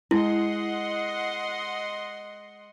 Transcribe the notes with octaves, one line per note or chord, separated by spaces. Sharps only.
G#3 E4 D#5 F#5 C6